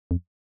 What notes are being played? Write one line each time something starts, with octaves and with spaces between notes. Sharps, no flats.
F2